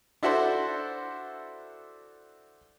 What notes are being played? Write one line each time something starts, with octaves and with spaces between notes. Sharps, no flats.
D4 E4 F#4 A4 C5